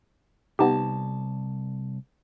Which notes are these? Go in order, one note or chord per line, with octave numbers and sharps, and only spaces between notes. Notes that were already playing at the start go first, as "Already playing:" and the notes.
C2 B3 D#4 G4 A5